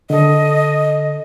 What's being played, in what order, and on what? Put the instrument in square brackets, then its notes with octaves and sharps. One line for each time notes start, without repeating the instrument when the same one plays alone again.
[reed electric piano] D3 A4 [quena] D#5